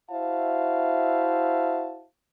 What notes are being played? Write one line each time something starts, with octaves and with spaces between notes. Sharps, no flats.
E4 F#4 C5 E5 F5 A5